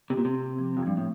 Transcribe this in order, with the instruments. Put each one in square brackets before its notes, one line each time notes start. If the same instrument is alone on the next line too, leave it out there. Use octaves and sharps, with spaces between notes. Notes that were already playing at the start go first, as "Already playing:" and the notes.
[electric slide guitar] C3 [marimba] G4
[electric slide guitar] A#2
C3
[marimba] C4
F3
[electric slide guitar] F2
[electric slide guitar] G2 [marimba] F3
[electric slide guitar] A2